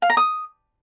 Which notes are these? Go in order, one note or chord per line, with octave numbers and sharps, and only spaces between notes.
F5
A#5
D#6